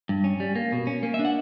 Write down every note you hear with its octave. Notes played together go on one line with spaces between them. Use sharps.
G2
C#4
G3
A#3
B2
C#4
A#3
E5
D4
F#5